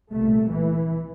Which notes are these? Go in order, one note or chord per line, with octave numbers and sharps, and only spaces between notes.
C2 A#2 A3
E3